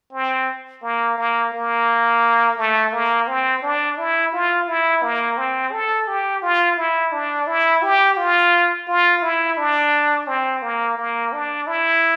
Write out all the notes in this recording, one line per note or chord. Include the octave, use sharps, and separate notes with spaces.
C4
A#3
A#3
A#3
A3
A#3
C4
D4
E4
F4
E4
A#3
C4
A4
G4
F4
E4
D4
E4
G4
F4
F4
E4
D4
C4
A#3
A#3
D4
E4